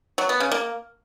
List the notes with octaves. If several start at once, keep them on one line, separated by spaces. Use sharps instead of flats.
F#3
B3
C#3
A#3